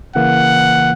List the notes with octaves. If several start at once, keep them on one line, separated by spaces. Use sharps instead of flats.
C#3 E3 A#3 F#5